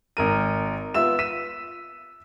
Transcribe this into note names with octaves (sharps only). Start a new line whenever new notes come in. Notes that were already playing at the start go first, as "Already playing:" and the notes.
G#1 A#4 D#7
B3 F4 E5 E6 E7
B6 D#7 E7